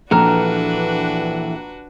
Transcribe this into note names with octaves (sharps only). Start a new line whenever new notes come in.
A#1 E3 D4 F#4 A4 B4 A#5 F6